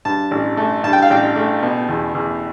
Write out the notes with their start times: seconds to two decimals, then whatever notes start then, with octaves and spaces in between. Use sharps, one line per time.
0.05 G2 A5
0.31 A1
0.57 A3
0.84 G2 A5
0.93 G5
1.02 F5
1.10 A1 G5
1.36 A3
1.63 B2
1.89 E2
2.15 E2